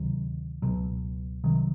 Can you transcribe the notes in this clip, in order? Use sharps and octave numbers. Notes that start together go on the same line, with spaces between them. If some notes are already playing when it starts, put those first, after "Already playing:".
Already playing: D2 C3 D#3 F#3
C#2 B2 F#3
C2 C3 D#3 F#3